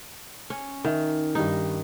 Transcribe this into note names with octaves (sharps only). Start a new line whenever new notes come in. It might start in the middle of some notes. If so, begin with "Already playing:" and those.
C#4
D#3 E5
G2 D#3 G3 D#4